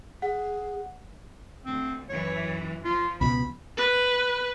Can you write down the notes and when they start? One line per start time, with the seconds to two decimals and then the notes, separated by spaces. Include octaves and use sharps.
0.22 G#4 F#5
1.66 D2 C4
2.09 F#2 E3 C#5
2.84 F3 F4
3.21 C#2 B2 B5
3.77 B4